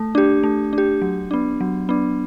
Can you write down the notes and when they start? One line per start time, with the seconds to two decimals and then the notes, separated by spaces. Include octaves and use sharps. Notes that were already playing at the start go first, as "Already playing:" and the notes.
Already playing: A3
0.15 D4 G4
0.43 A3
0.73 D4
0.78 G4
1.02 F#3
1.31 B3 D4
1.61 F#3
1.89 B3 D4